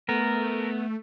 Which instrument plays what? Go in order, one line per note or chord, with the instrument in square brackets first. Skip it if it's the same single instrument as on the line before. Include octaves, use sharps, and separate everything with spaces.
[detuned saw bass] A3 [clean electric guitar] B3 [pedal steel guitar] A#4